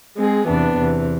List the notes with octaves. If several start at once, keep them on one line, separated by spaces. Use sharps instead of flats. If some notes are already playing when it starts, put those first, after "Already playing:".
G#3 C4 G#4
E2 C3 E3 B3 D4
E2 C3 E3